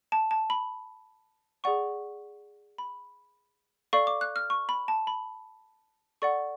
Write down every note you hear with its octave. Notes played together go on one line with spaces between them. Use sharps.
A5
A5
B5
G#4 D5 F#5 C#6
B5
A4 D5 F5 C#6
D6
F#6
F6
C#6
B5
A5
B5
A4 D5 F#5 C#6